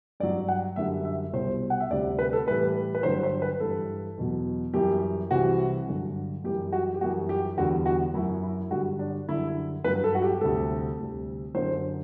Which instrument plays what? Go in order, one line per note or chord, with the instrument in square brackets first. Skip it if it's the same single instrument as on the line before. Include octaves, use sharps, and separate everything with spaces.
[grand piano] G2 F#3 D5
F#5
F#2 D3 G3 E5
E5
C2 B2 G3 C5
F#5
E5
D2 C3 G3 D5
B4
A4
A2 E3 G3 B4
B4
G2 D3 F#3 C5
C5
B4
G2 E3 G3 A4
E2 B2 F#3
F#2 E3 G3 G4
C2 C3 E3 F#4
G2 D3 F#3
F#2 E3 G3 G4
F#4
G4
F#2 E3 G3 F#4
G4
E2 D3 G3 F#4
F#4
F#2 E4
F#3
E4
G2 D3 G3 F#4
D4
F#2 D3 G3 E4
G2 F#3 B4
A4
F#4
G4
D2 C3 G3 A4
D2 C3 G3
F#2 D3 F#3 C5